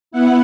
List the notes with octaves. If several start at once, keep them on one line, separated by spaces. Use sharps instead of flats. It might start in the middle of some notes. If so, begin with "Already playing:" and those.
B3 E4 F#5